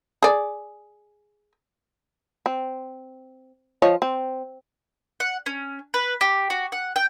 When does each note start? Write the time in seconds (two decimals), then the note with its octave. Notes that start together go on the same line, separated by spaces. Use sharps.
0.23 G#4 D5
2.46 C4
3.82 F3 C#5 D#5
4.02 C4
5.20 F#5
5.46 C#4
5.94 B4
6.21 G4
6.50 F#4
6.72 F#5
6.96 G5